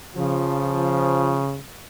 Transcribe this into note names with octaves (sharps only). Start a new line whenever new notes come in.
C#3 F3